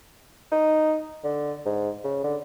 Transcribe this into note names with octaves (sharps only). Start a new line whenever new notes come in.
D#4
D3
G#2
C#3
D3